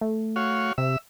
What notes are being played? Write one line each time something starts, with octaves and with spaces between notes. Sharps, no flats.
A3
F#4 C#5 F5
C3 E5